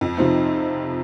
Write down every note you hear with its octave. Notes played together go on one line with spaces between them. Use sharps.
F2
C3 F3 C4 D#4